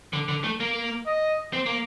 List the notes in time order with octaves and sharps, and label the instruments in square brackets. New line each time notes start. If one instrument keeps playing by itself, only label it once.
[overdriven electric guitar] D3
D3
A3
A#3
[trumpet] D#5
[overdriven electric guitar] C4
A#3